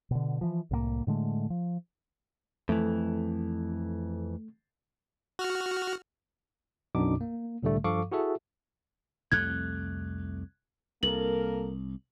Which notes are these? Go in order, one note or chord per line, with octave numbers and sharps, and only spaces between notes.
B2 D3
E3 F3
C2 A2 G#3 A#3
A2 D3 G#3 A3
F3
F2 E3 A3
F#4 F6
B1 F#2 B2 D4 D#4 D6
A#3
C2 A2 D3 G3 A3
G2 F3 A4 F5 C#6 D6
E4 F#4 G#4 A4 E5
C2 F2 A3 F#6 G#6
C2 A#3 A4 A#4 F#7